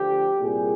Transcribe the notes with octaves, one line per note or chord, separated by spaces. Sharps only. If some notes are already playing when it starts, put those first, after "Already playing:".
Already playing: D2 D3 F3 G4
C2 A#2 G3 G#4